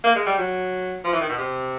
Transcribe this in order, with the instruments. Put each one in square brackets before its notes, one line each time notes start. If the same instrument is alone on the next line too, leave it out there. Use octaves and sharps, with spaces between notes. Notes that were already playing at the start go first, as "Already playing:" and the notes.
[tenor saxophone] A#3
G#3
G3
F#3
F3
E3
D#3
B2
C3